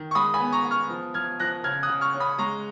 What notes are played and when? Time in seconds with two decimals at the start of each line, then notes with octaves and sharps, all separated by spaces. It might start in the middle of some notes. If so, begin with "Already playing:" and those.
Already playing: D#3
0.11 C#6
0.15 G#3 B5 D#6
0.34 G#5 B5
0.40 B3
0.52 A#5 C#6
0.65 B3
0.71 C#6 F6
0.89 F3
1.14 F3 F6 G#6
1.40 F3 F#6 A#6
1.64 C#3 F6 G#6
1.83 D#6 F#6
1.89 C#3
2.01 C#6 F6
2.14 C#4
2.20 B5 D#6
2.38 G#3 A#5 C#6